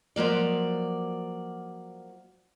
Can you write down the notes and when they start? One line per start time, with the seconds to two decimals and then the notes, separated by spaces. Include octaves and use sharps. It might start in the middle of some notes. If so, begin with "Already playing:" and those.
0.16 F3 F#3 A#3 D5